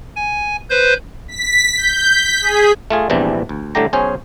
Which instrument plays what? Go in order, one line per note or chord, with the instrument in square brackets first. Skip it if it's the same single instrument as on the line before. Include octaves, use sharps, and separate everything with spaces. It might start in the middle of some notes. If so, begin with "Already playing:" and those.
[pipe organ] G#5
B4 C5 G6
[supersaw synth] B6
G6
B6
G#4
[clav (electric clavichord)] A3 F4 G#4
A#1 E2 C3 E3 G3 D4
D2
A2 D3 G3 A3 G4 A#5
B1 C#4 G#4 C5 C#5